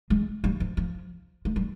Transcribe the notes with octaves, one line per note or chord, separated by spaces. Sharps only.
G#3
G3
F3
F3
G#3
G3